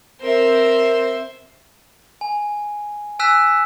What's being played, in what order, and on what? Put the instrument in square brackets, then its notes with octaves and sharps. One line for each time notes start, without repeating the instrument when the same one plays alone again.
[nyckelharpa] C4 A#4 [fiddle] C5 E5
[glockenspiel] G#5
G#5 E6 F#6 B6 E7